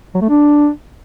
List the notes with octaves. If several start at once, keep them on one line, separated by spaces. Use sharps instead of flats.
F#3
A3
D4